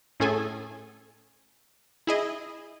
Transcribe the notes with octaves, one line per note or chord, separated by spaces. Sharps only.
A2 C#4 G#4 A4 G#5
E4 G#4 D#5